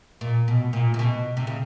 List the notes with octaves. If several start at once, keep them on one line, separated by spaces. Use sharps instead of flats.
A#2
B2
A#2
C3
B2
C3
C#3